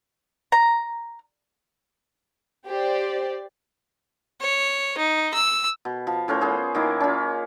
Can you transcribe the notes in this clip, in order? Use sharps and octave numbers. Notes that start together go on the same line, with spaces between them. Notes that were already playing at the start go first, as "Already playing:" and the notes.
A#5
G4 C5 D5
C#5
D#4
E6
B2
F3
A2 C#4 A#4 C5
B3 C#4 G#4 C5
D#3 A#3 D#4 E4
C#4 F4